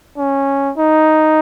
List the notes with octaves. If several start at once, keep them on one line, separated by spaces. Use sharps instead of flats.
C#4
D#4